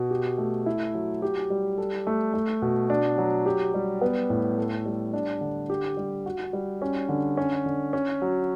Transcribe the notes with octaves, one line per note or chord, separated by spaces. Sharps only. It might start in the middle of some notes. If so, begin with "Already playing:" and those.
Already playing: B2
G4
A3
E4
F#3
G4
G3
A4
A3
A3
B2
D4
F#3
G4
G3
B3
A2
A4
G3
D4
D3
G4
G3
F#4
G3
C#4
D3
C#4
D3
C#4
F#3